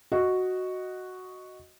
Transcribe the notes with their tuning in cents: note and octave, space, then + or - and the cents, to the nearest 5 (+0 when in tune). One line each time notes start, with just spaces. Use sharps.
F#4 +0 D#5 +0